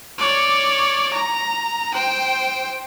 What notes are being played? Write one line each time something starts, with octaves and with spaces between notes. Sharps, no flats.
C#5 D5
A#5
C5 G5